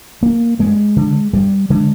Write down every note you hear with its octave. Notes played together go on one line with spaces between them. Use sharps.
A#3
G2 G#3
D3
G2 G3
D3 G#3